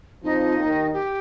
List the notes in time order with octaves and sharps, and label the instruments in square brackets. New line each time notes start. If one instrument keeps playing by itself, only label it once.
[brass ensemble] F2 F3 [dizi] D#4
[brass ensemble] D#2 D#3
[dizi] G4